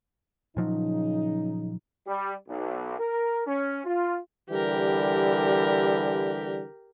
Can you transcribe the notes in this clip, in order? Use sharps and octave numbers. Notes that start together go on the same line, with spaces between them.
A#2 C#3 F3 F#3 D#4
G3
B1
A#4
C#4
F4
D3 E3 G3 G4 A#4